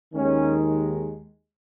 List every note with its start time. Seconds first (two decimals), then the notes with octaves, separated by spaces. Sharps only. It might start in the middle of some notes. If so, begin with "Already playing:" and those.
0.14 D#2 D#3 G#3 C#4